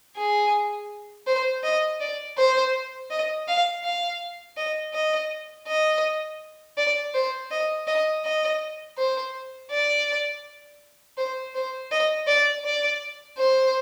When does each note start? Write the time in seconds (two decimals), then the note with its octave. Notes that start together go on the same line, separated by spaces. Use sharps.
0.16 G#4
1.27 C5
1.64 D#5
2.00 D5
2.37 C5
3.10 D#5
3.47 F5
3.84 F5
4.57 D#5
4.93 D#5
5.67 D#5
6.77 D5
7.14 C5
7.51 D#5
7.87 D#5
8.24 D#5
8.97 C5
9.71 D5
11.17 C5
11.55 C5
11.91 D#5
12.27 D5
12.64 D5
13.38 C5